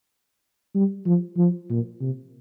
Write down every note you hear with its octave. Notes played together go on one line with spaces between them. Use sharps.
G3
F3
F3
A#2
C3